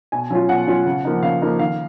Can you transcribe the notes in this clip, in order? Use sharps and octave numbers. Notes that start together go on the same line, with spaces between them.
B2 G#5
F#3 C#4 F4
B2 F#5
F#3 C#4 F4
C#3
F3 A#3 D#4
C#3 F5
F3 A#3 D#4
D#3 F5